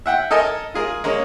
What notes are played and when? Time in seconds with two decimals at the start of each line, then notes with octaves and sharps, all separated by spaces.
0.06 E5 F#5 G5
0.31 A4 A#4 D#5 G#5 A5
0.74 F4 G#4 A#4
1.04 G#3 A#3 C#4